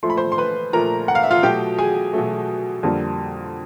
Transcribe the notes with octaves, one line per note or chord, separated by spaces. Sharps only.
A#2 F3 A3 C6
B5
C5 C6
C6
B4 B5
A#2 F3 A3 A#4 A#5
F#5
F5
E5
F4 F5
B2 F#3 A3 G4 G5
G#4 G#5
B2 F#3 A3
F2 D3 G3 A#3